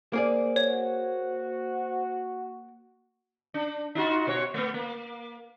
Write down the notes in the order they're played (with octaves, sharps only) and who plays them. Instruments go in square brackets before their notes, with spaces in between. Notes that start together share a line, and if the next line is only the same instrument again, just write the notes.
[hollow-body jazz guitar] A#3 G#4 D5 [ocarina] C5
[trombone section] F#4 [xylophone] C#5
[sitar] D4
D#4 F4 F#4
B2 F#4 C#5
A3 B3
A#3